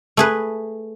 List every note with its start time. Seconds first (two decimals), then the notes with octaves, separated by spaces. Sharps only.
0.17 A3 G#4 B4